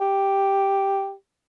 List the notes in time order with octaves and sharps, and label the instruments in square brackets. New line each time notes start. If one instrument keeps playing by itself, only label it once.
[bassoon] G4